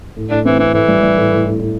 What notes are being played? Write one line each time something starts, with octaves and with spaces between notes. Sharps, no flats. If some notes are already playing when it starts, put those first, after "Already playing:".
A2
A2 D4
E3 C4
E3 C4
A2 E3
G3
G3
A2
A2
A2
A2